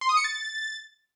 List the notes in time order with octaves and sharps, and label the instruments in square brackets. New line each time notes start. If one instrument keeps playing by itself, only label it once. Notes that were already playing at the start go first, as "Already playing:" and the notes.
[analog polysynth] C6
D#6
C#7
A6